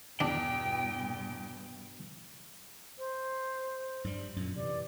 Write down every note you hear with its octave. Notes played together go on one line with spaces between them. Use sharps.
E2 G2 B2 D4 G5
C5
G2 G3
F#2 A#2
C3 E3 D5